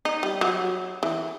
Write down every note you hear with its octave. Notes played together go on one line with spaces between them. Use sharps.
D#4
G3
F#3
E3